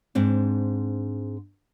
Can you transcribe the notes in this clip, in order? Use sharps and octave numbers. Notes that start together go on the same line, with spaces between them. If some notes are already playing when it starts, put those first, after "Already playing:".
G#2 C4 D4